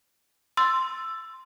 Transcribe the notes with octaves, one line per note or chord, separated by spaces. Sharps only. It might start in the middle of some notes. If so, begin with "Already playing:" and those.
C6 E6 A6